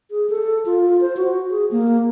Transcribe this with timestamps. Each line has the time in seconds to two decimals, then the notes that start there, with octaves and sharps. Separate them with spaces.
0.11 G#4
0.30 A4
0.66 F4
1.01 C5
1.17 F#4
1.50 G#4
1.71 A#3